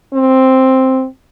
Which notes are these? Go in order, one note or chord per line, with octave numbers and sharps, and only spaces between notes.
C4